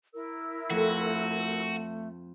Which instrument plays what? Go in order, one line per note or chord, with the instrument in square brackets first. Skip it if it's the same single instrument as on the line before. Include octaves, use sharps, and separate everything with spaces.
[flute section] E4 A#4 E6
[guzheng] F2 [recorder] A3 [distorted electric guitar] F#4